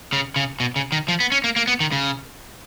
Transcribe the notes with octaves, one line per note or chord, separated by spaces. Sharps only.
C#3
C#3
B2
C#3
D#3
F3
B3
C#4
A#3
A#3
B3
D#3
C#3